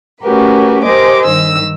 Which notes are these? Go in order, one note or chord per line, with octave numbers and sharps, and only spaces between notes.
A3 C#4 F#4 G4 A#4 B4
G4 A#4 C5 D#5 G#5 D6
G2 D#3 E6